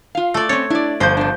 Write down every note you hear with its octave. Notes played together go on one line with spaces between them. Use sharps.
F4 F5
A3 D5
C4 C#4 C#5 A6
D4 E4 D5
G1 F3 C5 G6
C3 D4